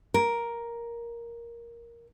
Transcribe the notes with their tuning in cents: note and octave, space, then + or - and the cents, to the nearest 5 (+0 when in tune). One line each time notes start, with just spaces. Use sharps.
A#4 +5